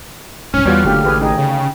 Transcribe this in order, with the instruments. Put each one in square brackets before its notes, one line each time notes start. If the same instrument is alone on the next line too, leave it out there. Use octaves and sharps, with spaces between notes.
[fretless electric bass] C2 G#2 [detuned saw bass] C#4 [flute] F6
[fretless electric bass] E2 B3 [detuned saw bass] G3 [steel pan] F4 F#4 C#5
[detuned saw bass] F#1 [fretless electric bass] D3 A3 [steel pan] A#3 G4
[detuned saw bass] A1 [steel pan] G4 G#4 B4
[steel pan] D#4 G#4 [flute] G5
[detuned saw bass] C#3